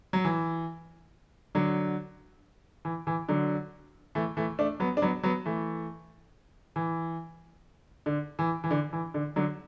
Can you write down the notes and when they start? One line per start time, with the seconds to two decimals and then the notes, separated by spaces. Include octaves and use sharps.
0.13 F#3
0.25 E3
1.55 D3 F#3
2.85 E3
3.07 E3
3.29 D3 F#3
4.15 E3 A3
4.37 E3 A3
4.59 A3 D4
4.80 F#3 B3
4.97 D4
5.02 F#3 B3
5.23 F#3 B3
5.46 E3 A3
6.76 E3
8.06 D3
8.39 E3
8.64 E3
8.71 D3
8.93 E3
9.14 D3
9.36 D3 F#3